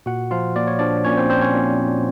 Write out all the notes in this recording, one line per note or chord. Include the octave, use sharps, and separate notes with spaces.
A#2 F#4 F#5
F3 F4 F5
A#2 D5
C#5
F3 D4 D5
A#2 C#4 C#5
C4 C5
F3 C4 C5
C#4 C#5
A#2